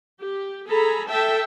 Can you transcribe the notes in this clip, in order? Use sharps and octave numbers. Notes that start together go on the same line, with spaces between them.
G4
G#4 A4 A#5 B5
A4 E5 G5 A5